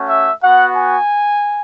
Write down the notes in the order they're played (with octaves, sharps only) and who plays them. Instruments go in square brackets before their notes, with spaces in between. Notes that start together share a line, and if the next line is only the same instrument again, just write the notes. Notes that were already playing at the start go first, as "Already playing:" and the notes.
Already playing: [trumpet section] A3 C#4 F#4
E5
B3 F#4 F#5
G#5